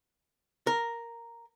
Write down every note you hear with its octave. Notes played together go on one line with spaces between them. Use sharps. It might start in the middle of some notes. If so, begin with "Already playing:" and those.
A#4